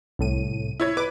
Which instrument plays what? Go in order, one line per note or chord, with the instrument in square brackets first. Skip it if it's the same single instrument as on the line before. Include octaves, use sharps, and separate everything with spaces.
[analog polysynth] C2 A2 D#7
[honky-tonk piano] E4 C#5 G#6
[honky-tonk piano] B4 [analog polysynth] D6